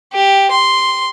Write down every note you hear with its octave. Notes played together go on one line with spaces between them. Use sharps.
G4
C6